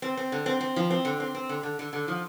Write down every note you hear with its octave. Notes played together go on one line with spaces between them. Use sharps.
C4
C4
D3
C4
C4
F3
C4
D3
C4
C4
D3
D3
D3
D3
F3